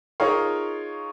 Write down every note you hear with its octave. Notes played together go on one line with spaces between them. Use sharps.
D#4 F4 G#4 A#4 C#5 F5